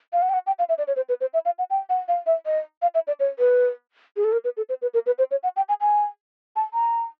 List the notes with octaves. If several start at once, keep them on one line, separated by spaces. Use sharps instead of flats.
F5
F#5
G5
F#5
G5
F5
E5
D5
C#5
C5
B4
C5
E5
F5
F#5
G5
F#5
F5
E5
D#5
F5
E5
D5
C#5
B4
G#4
A4
A#4
B4
A4
C5
B4
A#4
B4
C5
C#5
F#5
G5
G#5
G#5
A5
A#5